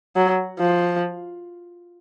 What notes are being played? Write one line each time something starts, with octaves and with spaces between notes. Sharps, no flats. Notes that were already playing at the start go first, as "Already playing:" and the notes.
F#3
F3